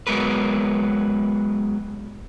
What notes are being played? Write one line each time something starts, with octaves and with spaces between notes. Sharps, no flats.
F#3 G#3 B3 A#4 B4